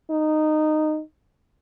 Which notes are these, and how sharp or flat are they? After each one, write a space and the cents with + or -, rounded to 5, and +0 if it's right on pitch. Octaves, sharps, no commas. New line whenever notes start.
D#4 -15